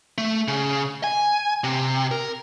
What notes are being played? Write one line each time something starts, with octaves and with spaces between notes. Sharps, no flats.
A3
C#3
G#5
C3
A#4